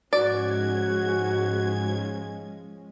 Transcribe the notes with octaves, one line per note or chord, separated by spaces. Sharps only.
G#2 F3 G#3 C#4 F#4 D5 G#6